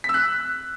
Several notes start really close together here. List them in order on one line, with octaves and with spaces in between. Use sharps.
B6 E6 F#6